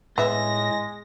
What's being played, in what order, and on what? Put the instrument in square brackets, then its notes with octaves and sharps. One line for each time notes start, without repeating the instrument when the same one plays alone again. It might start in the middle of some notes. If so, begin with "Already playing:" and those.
[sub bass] A2 [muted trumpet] G#3 [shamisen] B3 E5 [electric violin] A#6